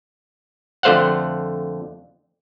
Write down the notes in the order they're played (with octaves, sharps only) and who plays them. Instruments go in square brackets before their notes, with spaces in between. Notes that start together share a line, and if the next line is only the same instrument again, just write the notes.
[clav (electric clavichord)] F2 D3 A3 C5 F5 F#5